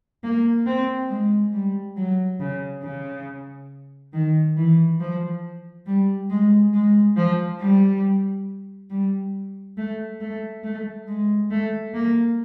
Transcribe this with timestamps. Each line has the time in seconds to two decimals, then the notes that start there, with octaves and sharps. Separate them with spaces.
0.23 A#3
0.66 C4
1.10 G#3
1.53 G3
1.96 F#3
2.40 C#3
2.83 C#3
4.13 D#3
4.56 E3
5.00 F3
5.86 G3
6.30 G#3
6.73 G#3
7.17 F3
7.60 G3
8.90 G3
9.77 A3
10.21 A3
10.63 A3
11.07 G#3
11.50 A3
11.94 A#3